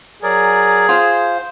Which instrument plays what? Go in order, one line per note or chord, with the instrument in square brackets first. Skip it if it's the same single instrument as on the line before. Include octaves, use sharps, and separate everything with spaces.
[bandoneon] F#3 A#4 D5 [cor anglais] G#4
[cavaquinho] F4 F5 [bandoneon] C5